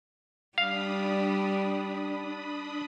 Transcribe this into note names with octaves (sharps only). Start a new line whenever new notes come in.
G3 D4 F5 B5 D#6